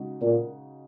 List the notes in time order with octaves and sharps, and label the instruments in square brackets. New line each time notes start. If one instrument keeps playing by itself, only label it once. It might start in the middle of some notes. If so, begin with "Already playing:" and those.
Already playing: [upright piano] C#3 G#3 D#4 F#4
[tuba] A#2